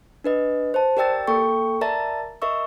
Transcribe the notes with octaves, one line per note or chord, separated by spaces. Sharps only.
D4 B4 D#5
C5 A5
G4 A#4 D5 G5 E6 A6
A#3 A4 G5 C#6
A#4 D5 E5 A5 A#5 A6
A#4 D#5 E5 C#6 E6